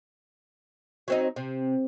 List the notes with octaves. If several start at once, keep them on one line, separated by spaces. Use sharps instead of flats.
F#3 C4 D#4
C3